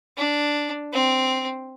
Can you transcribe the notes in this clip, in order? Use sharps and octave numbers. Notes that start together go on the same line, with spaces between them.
D4
C4